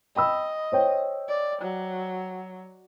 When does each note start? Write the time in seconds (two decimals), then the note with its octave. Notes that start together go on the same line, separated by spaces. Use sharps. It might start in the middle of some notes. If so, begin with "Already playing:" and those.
0.16 D#5 G5 B5 E6
0.72 C5 C#5 G5
1.29 D5
1.62 F#3